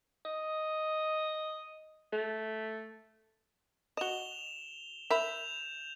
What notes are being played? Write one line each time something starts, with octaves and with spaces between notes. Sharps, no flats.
D#5
A3
F#4 D#5 E7 F7 G7
A#4 E5 B5 G6 E7 F7